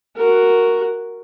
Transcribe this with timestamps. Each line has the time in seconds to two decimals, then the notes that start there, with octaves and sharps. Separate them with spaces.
0.17 F#4 A#4